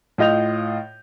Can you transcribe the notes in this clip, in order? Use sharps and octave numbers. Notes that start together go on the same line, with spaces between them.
A2 F4 D#5 G6 F7